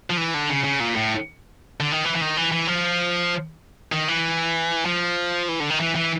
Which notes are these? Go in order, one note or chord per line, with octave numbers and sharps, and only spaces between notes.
F3
E3
D3
C#3
C#3
A#2
A2
D3
D#3
E3
E3
D#3
E3
E3
F3
D#3
E3
F3
E3
D3
D#3
E3
E3